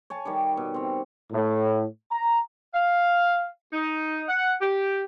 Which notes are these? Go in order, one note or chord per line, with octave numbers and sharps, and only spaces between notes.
C#5 G#5 A5
D#3 G3 G4 C#5
B2
C4 C#5
A2
A#5
F5
D#4
F#5
G4